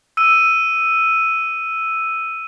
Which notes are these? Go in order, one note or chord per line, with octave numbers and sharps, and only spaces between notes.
E6 D#7